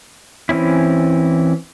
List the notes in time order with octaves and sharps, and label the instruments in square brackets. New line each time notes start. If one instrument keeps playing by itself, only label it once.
[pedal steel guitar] E3 C4 C#4 E4